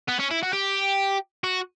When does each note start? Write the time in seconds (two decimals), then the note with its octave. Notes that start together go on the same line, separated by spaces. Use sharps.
0.09 B3
0.20 C#4
0.31 E4
0.43 F#4
0.53 G4
1.44 F#4